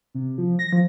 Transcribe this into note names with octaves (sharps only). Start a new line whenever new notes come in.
C3
F3
A#6
F3